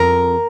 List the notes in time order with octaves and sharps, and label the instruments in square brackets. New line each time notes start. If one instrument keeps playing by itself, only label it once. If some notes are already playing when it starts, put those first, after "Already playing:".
Already playing: [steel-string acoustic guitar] F2 A#4